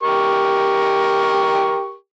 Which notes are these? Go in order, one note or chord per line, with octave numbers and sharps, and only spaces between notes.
G4 A#4 C#6